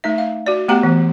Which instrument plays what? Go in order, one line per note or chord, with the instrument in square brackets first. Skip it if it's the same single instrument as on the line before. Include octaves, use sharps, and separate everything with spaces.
[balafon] A3 D#4 E5
F5
F#4 D5
A3 B3 G4 F#5 G5 A#5
E3 B3